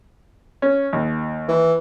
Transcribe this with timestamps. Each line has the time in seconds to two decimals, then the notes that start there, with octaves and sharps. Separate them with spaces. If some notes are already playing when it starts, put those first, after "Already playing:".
0.62 C#4
0.93 D#2
1.49 E3